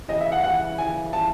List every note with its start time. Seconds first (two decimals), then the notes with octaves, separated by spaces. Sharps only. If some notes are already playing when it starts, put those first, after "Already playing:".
0.08 C#3 E3 G3 D#5
0.20 E5
0.32 F#5
0.43 C#3 E3 G3 F#5
0.78 C#3 E3 G3 G#5
1.13 C#3 E3 G3 A5